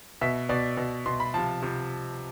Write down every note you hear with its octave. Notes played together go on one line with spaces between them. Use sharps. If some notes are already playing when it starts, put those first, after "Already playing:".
B2 E5
B2 D5
B2
B2 C6
B5
C3 F3 A5
C3 F3